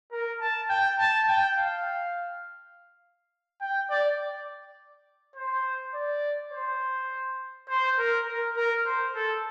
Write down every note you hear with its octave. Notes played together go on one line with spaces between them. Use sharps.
A#4
A5
G5
A5
G5
F5
G5
D5
C5
D5
C5
C5
A#4
A#4
A#4
C5
A4